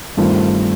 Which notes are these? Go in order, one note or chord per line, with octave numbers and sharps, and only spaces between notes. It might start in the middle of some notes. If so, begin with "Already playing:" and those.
G2 D#3 A3 C4 F4